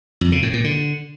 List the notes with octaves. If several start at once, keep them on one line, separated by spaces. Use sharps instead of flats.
F2
C#3
A2
A#2
D3